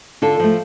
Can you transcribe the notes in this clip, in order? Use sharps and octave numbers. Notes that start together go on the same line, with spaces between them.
D3 F4 A4
F3 A3